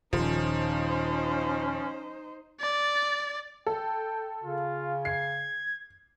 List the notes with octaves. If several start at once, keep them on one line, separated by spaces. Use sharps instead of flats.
D#1 F3 C#4 D#4 C5
D5
A4 G5
C#3 F4
G#6 C7